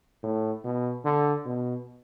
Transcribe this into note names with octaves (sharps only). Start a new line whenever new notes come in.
A2
B2
D3
B2